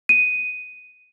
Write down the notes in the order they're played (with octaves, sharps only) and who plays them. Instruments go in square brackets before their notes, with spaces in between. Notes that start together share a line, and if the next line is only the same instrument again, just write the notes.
[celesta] D#7